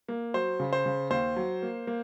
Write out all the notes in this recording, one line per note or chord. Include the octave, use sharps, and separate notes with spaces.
A#3
F#3 C5
C#3
C5
C#3
D#2 C5
F#3
A#3
A#3